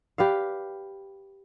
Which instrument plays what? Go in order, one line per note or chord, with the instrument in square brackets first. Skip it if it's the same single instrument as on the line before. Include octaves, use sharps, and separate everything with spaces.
[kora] G4 B4 D5 F5